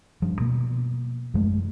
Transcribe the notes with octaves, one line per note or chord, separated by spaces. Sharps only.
G2 F3
B2 A#3
F#2 F3 G#3 A3